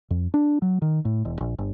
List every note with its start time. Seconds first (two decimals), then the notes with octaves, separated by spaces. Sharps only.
0.11 F2
0.34 D4
0.62 F#3
0.82 D#3
1.05 A2
1.25 E1
1.41 A#1
1.59 G1